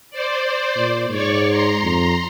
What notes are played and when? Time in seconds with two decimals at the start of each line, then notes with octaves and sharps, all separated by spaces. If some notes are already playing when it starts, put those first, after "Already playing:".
0.10 C5 D5
0.76 A#2
1.10 G#2 C#5 D5 C#6
1.47 A#5 C6
1.84 F2